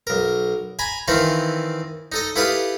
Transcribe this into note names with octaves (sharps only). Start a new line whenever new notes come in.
B1 A#4
G#5 A#5 B5
D#3 E3 C4 D#4 E4 F5
D#4 A4 D#5
E4 G4 A4 B4 F5 D#6